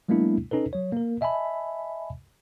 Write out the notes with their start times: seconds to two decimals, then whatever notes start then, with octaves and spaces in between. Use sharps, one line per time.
0.08 F#3 G#3 A#3 B3 D4 E4
0.51 C#4 D#4 A4 B4
0.73 F#3 C#5
0.92 A#3 A#4
1.21 D#5 E5 G#5 A5 B5